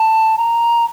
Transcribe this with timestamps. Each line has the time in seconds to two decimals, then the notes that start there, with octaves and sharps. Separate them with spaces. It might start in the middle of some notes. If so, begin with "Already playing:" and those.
Already playing: A5
0.38 A#5